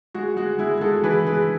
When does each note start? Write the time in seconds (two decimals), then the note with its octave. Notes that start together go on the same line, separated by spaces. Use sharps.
0.14 G#3 F#4
0.37 G#3 F#4
0.59 G#3 E4 G#4
0.77 G#4
0.81 G#3 F#4 A4
1.04 E3 G#4 B4
1.26 G#3 G#4 B4